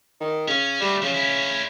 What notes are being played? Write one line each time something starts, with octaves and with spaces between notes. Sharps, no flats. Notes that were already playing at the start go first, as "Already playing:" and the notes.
D#3
C#3 C#4
G3 A3 F#4
C#3 F3 F#4
C#4 E4